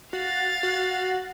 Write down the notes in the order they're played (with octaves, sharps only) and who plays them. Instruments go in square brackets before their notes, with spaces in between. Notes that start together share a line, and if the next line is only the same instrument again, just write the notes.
[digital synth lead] F#4 [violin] F5 A6
[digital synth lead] F#4